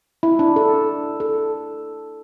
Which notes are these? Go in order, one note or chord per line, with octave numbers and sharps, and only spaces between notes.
E4
D4
A4
A4